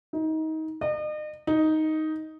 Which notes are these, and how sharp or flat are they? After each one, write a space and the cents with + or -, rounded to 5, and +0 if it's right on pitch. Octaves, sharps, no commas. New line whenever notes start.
D#4 +25
D#5 -40
D#4 +5